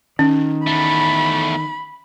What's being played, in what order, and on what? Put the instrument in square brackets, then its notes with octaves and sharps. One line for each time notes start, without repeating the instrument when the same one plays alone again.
[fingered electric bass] D#3 [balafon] C#4
[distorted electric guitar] E2 A3 [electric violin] B5